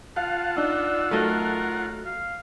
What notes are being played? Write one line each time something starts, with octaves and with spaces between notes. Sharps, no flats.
F4 F5 F#5 A5
D4 D#4 E6
F#3 A3 D#4 A4 A#4
F5